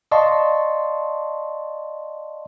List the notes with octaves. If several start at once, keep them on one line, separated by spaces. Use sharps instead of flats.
D5 D#5 F5 A5 C6 C#6